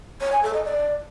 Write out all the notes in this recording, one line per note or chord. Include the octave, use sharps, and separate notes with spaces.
C#5
G#5
A4
D#5
D5